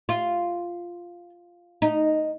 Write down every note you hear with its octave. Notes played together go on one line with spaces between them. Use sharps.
F4
D#4